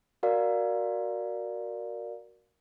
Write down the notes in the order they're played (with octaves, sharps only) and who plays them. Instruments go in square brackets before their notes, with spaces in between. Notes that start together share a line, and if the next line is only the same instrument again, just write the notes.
[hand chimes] F#4 A#4 D5 F5